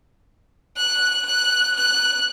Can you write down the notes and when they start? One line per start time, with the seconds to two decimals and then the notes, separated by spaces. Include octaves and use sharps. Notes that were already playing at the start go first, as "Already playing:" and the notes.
0.77 F#6
1.26 F#6
1.76 F#6